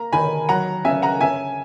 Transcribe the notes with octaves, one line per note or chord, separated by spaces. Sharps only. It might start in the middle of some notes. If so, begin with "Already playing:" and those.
Already playing: A#3 A#5
D#3 G#5 B5
F#3 F#5 A#5
C#3 E5 G#5
F#5 A#5
C#4 E5 G#5